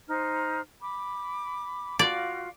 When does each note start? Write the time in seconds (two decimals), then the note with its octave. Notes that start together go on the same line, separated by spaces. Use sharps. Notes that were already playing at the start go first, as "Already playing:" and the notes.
0.08 D#4 C5 F6
0.81 B5 D6
1.99 F4 F#4 D5 F5